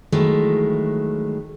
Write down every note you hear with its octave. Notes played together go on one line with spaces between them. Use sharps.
D#3 E3 F#3 G#3 A3